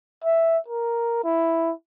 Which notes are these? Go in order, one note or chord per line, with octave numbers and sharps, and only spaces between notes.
E5
A#4
E4